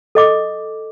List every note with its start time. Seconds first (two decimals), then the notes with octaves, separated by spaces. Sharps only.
0.15 A4 D#5 D6